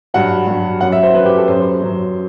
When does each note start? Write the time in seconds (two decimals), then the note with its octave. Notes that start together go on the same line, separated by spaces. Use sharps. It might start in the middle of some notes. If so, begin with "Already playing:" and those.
0.14 G2 F#3 F#5
0.47 G2 F#3
0.81 F#2 F#3 F#5
0.92 E5
1.03 C5
1.14 F#3 B4
1.19 F#2
1.26 G4
1.37 A4
1.48 F#2 F#3 C5
1.81 F#2 F#3